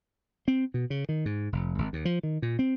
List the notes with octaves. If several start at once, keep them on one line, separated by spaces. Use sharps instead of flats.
C4
B2
C#3
D#3
G#2
F1
G#1
D#2
F3
D#3
A#2
C4